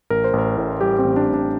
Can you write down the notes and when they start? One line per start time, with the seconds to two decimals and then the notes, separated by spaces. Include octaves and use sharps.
0.10 A1 A#4
0.24 C5
0.33 A1
0.38 A#4
0.57 A2
0.81 G3 G4
0.99 C4
1.04 A1
1.16 D4
1.28 A1
1.34 D4